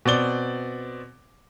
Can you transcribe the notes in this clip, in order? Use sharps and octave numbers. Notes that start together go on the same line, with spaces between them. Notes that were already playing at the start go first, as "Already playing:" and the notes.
B2 C4 D5 G7